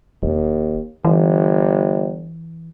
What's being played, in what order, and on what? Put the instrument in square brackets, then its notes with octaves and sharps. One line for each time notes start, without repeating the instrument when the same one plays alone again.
[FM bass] E1 [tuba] D#2
[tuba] G1 [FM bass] E3